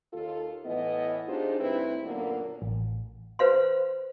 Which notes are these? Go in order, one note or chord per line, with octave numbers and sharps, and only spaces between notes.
D#2 F4 A4
A2 E3 B3 E4 D#5
D4 D#4 F4 G4 G#4 C5
D2 G2 C4 E4 B4
F#2 A#2 D3 F#3 A#3 B3
A1
B4 C5 F5 C6